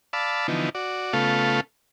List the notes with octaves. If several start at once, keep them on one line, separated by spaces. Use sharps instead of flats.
D5 F5 A5 B5 E6
D3 E3 F3 B3 D#4
F#4 D5
C#3 A3 B3 F4 A4 F5